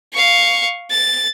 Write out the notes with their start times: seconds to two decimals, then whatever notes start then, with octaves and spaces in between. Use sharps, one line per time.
0.13 F5 C#6
0.91 A6